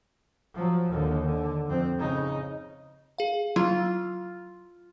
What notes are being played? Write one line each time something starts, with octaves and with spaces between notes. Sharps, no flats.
F3 F#3
D#2 D3
D3
F2 C4
C#3 D#4
G#4 F5
F#3 F4